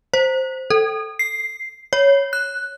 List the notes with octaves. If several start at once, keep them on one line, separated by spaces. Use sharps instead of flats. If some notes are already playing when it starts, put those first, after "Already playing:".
C5
A4
C7
C#5
F#6